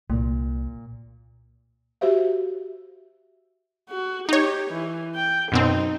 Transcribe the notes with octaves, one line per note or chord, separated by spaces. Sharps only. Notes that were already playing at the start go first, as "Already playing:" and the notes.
C2 A#2
F#4 G4 C5 E5 F5
F#4
D#4 G4 C#5
E3
G5
F#2 B2 C4 D#4